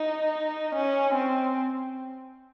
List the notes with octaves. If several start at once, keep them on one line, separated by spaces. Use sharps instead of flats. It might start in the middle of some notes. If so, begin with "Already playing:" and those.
Already playing: D#4
C#4
C4